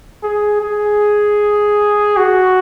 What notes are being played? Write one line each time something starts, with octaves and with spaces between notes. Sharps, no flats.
G#4
G#4
F#4